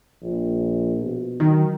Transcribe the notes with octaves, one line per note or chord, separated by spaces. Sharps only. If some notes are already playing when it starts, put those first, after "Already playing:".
A#1
B2
D#3 F#3